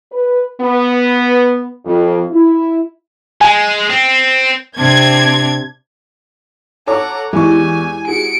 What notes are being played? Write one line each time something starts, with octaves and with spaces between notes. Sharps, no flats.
B4
B3
F2
E4
G#3 G#5
C4
C3 C4 D4 G#6
A4 C#5 F#5 A#5 D6
E2 G#3 E4 G4 G#5 C#6
F#4 G#4 C#7 D7